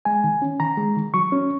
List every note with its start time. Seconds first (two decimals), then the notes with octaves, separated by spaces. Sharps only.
0.05 G#3 G#5
0.24 D#3
0.42 C#4
0.60 D#3 A#5
0.78 G#3
0.96 D#3
1.14 F#3 C#6
1.32 C#4